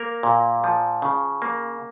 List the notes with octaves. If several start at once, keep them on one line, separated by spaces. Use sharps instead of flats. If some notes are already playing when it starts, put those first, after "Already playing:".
Already playing: A#3 A#4
A#2
F3
C#3
A#3